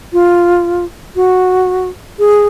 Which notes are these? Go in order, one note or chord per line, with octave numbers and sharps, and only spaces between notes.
F4
F#4
G#4